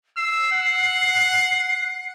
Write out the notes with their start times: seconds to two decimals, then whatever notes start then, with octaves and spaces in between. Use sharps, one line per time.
0.17 E6 C7
0.52 F#5